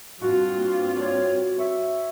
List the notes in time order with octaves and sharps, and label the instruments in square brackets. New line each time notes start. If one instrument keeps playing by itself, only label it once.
[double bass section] G2 C4 [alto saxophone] F4 [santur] F#4
[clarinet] A#3
[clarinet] C#5 [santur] D5
[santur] C#5 [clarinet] E5